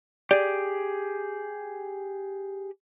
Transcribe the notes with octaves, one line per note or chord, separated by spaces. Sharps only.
G4 G#4 D5